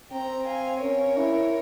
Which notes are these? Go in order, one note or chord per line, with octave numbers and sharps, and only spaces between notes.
C4 G5 A#5
F5 G#5
C#4 A#4 C#5
E4